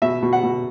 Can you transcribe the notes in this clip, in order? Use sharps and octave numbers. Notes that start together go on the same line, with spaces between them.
B2 E5
B2
F#5
B2